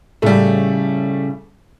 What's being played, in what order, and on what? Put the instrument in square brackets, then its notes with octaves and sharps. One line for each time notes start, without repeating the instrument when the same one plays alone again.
[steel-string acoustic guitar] A2 C#3 [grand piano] G3 A3